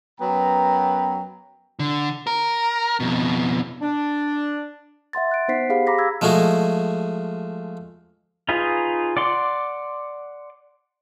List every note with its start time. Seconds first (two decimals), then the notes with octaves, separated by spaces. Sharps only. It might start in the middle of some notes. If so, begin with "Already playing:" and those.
0.21 F#2 F#3 B3 G5 A#5
1.79 D3
2.27 A#4
3.00 F2 B2
3.81 D4
5.13 E5 F#5 C6 A6
5.31 F#6 D7
5.48 B3 D#4 C5 F#5 B6 C7
5.69 G4 G#4 F5 B5
5.87 A#5 B5 D6 A#6 B6
5.98 E6 G#6
6.21 F3 G#3 A3 F#4 G#4
8.49 D#4 F4 G#4 B4
9.17 D5 F#5 C6 D6